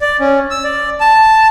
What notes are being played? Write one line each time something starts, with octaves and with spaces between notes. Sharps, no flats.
D5
C#4
E6
D5
A5